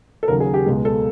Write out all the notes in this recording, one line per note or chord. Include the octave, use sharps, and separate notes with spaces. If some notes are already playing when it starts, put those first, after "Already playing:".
A4
D#2 C#3 F#3 A#4
G#4
G4
C#2 B2 G#3
A4